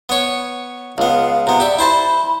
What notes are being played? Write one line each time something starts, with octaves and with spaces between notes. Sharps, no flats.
B3 C#5
C#2 B3 F5
C3 B3 A#5
G4 D5 E5
E4 C5 A5 B5